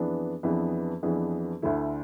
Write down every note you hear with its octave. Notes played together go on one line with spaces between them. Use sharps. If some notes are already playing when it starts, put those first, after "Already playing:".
Already playing: F2 E3 B3 D4 G#4
F2 E3 B3 D4 G#4
F2 E3 B3 D4 G#4
D2 D3 A3 E4